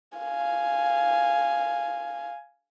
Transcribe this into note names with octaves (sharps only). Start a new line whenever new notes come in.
F5 G#5